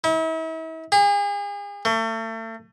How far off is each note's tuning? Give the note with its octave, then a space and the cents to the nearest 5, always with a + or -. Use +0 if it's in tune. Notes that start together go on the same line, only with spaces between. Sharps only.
E4 -40
G#4 -40
A3 +35